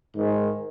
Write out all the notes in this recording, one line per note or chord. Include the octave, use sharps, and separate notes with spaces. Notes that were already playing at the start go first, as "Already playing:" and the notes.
G#2 D#3 G#3